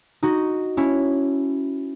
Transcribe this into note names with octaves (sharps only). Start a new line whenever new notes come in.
D#4 F#4
C#4 E4